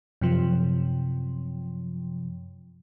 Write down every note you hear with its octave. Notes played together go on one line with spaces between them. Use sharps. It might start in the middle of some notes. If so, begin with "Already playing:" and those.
F#2 C3 F3